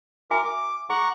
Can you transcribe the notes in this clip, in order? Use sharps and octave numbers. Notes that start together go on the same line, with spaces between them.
F#4 A#4 E5 G#5 D6
D6
G#4 F#5 A#5 C#6